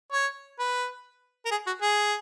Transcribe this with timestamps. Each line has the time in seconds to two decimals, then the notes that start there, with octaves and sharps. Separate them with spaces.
0.13 C#5
0.59 B4
1.46 A#4
1.51 G#4
1.67 F#4
1.82 G#4